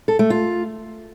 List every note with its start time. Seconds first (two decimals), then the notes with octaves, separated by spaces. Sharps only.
0.08 A4
0.19 A3
0.30 F4